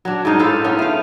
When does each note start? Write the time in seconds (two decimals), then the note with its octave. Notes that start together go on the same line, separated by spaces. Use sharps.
0.05 F#3 D4
0.25 G#2 D4 D#4 F5
0.39 A2 A4 C5 F5
0.64 B3 C#4 D#4 F4
0.79 A3 F5